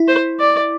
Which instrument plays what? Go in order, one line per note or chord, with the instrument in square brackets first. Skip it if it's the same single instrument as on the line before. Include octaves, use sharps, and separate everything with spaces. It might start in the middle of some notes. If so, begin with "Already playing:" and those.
Already playing: [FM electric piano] E4
[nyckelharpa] C5
D5